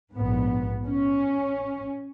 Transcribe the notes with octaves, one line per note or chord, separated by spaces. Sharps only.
A#1 G#2 B3
C#4